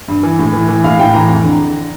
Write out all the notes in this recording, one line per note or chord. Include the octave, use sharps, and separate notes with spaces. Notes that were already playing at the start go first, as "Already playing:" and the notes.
G2
E3
A2
E3
E3
A2 F5
A2 G5
E3 A#5
F2
D3
D3